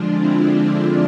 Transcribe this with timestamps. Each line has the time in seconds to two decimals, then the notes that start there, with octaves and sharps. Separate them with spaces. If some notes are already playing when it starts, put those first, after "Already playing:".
Already playing: D3 F3 G#3 D4 F4
0.16 C4 E4
0.63 D4